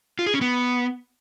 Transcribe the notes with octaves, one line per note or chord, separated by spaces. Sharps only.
F4
G#4
C#4
B3